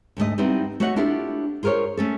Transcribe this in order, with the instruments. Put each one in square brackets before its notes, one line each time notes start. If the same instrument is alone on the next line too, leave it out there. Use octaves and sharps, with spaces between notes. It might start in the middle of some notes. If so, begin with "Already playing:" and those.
[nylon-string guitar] D2 G#2 A3 D#5
G3 B3 C4 D#4 E4
A3 F#4 C#5 D#5 F#5
D4 E4 F4 G4 A4
F4 G#4 A#4 C5 C#5
A3 C#4 A4